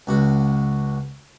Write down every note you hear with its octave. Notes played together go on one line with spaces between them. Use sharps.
C#2 F#4